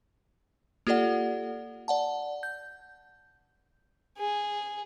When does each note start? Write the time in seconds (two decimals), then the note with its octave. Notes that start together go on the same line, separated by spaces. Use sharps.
0.87 A#3 F4 G4 A4 D5 F#5
1.88 D5 F#5 A5
2.43 G6
4.18 G#4